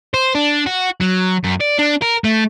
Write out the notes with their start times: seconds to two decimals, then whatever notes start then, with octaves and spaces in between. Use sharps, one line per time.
0.14 C5
0.35 D4
0.66 F#4
1.01 F#3
1.44 F#2
1.61 D5
1.79 D4
2.02 A#4
2.24 A3